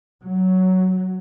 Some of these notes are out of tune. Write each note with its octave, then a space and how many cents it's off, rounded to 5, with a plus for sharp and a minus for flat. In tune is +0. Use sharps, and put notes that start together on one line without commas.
F#3 +5